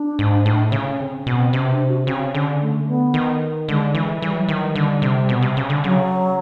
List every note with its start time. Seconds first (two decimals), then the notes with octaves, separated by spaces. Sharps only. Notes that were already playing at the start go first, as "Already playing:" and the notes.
Already playing: D4
0.19 G#2
0.46 A2
0.72 C#3
0.90 C#4
1.00 C4
1.18 C#4
1.27 B2
1.36 C4
1.53 C3 C#4
1.71 D4
1.89 F#4
2.07 C#3 C4
2.33 D3 C#4
2.61 A3
2.88 B3
3.14 D#3
3.68 D3 G#3
3.95 E3
4.22 E3 G3
4.35 F#3
4.49 D#3 F#3
4.62 G3
4.76 D3
5.02 C3
5.29 B2
5.42 C3
5.57 C#3
5.70 D3
5.84 C#3 F#3